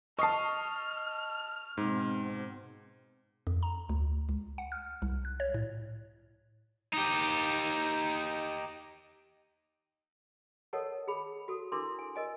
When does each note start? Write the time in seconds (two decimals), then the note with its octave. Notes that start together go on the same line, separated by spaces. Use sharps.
0.19 D#5 A5 C#6 D#6 F6 C7
1.77 G#2 B2 C4
3.47 F2
3.63 A#5
3.89 D2
4.29 C#2
4.58 F#5
4.72 F6
5.02 C2
5.25 F#6
5.40 C#5
5.54 A2
6.94 D#4 G4
10.73 A4 A#4 C#5 D#5 F#5 A5
11.08 G#4 B5
11.48 F#4 A4
11.72 D4 E4 A4 A#4 C6 D6
11.99 G#5
12.16 A#4 D#5 G#5